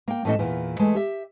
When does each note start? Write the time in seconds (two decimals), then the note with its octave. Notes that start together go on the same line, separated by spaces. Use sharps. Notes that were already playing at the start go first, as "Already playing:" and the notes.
0.08 A#3 G5
0.25 A2 E3 A3 C#4 D#5 A5
0.39 E2 A#2 E3
0.79 E3 G#3 A3
0.95 G4 E5